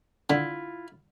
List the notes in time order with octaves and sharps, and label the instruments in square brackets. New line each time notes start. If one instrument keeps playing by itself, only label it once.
[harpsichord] D3 [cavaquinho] E4 F4